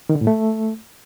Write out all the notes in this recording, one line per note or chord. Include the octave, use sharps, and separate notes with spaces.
D#3
D3
A2
A3